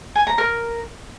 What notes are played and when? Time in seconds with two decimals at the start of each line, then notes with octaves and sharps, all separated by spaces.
0.15 G#5
0.27 A#5
0.38 A#4